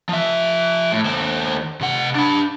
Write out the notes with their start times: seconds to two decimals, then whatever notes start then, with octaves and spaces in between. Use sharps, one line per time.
0.09 F3 E5
0.92 A2
1.05 D#2 C5
1.81 C3 F#5
2.15 D4 B5